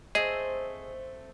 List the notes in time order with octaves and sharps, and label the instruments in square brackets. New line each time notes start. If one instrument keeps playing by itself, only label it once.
[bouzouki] A3 C4 C5 [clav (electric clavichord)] G#4 [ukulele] D#5